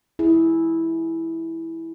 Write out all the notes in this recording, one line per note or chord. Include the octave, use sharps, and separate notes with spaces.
E4 G#4